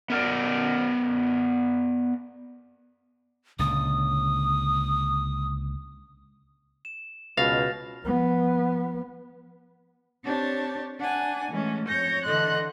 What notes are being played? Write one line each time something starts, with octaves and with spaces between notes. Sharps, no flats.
B3 A#4 D5
C#2 A#2 D3 D#6
E7
C#2 B2 F5 F6 A6 A#6
F3 B3
C4 D4 G4 C#5 A5
D4 F#5 G#5
E3 G#3 A3 C#4
F2 C#5 G6 A#6
D3 E3 A4 D#5 C6 F#6